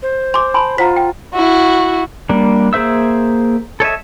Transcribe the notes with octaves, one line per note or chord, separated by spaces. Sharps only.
C5
G#5 C6 D6
G#5 A5 B5 C6
F4 C5 F#5 A#5 B6
G5
E4 F#4
G3 A#3 D4
A#3 G#4 C5 E5 E6
A4 C#5 D#5 E5